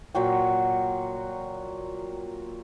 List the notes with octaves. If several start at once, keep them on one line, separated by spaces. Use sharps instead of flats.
A#2 F#3 F#4 G5